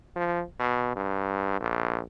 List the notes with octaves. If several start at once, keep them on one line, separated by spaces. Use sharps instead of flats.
F3
B2
G2
A#1